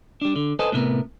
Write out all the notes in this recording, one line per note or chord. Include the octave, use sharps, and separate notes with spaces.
G3 D4
D3
A4 B4 C5 D#5 G#5 A5
A2 C3 B3 A#4